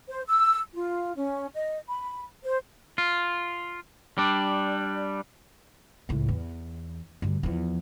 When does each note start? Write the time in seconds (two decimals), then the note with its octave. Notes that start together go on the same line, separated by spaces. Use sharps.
0.08 C5
0.27 E6
0.73 F4
1.16 C#4
1.54 D#5
1.88 B5
2.43 C5
2.98 F4
4.18 G3 D4
6.09 C#2 A2
6.28 E2
7.22 D2 G2
7.43 E2 F3